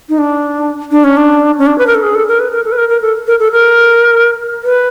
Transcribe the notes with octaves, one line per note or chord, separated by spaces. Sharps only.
D#4
D4
D4
C#4
D4
C#4
D4
B4
A#4
A4
G#4
A4
A#4
B4
A#4
A4
B4
A#4
A#4
A4
A#4
A4
A#4
B4